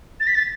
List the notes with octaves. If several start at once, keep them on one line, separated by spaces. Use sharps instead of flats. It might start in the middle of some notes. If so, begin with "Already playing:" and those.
A6
B6
A6